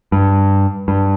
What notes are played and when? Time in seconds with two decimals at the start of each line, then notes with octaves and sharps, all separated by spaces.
0.12 G2
0.88 G2